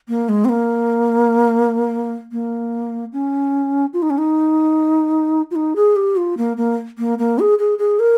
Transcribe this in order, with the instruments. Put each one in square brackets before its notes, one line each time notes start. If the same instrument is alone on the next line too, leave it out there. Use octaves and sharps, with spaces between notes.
[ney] A#3
G#3
C4
A#3
A#3
C#4
F4
D#4
C#4
D#4
F4
D#4
G#4
G4
F4
A#3
A#3
A#3
A#3
G#4
G#4
G#4
A#4